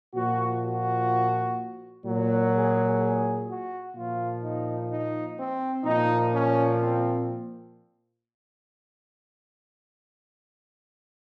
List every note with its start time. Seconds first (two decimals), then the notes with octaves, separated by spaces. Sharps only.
0.14 A#2 F3 F#4
0.61 F#4
2.04 A#2 F#3
2.51 G#4
2.99 G#4
3.47 F#4
3.94 A#2 F3 F4
4.42 D#4
4.89 D#4
5.37 C4
5.84 A#2 F3 D#4
6.32 C#4
6.79 C4